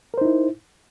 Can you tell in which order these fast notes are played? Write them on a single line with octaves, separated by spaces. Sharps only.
A#4 C5 D#4 E4